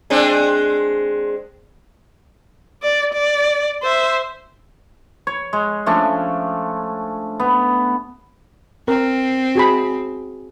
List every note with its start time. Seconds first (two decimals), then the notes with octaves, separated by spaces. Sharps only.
0.10 G#3 C4 D4
2.83 D5
3.14 D5
3.83 C5 E5
5.27 C#5
5.53 G#3
5.86 F3 A3 C#4 D4
7.40 B3
8.88 C4 A#4
9.55 F#4 G#4 B5